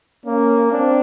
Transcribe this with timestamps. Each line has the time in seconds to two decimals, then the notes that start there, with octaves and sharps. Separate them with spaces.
0.25 A#3 C#4
0.72 C4 D4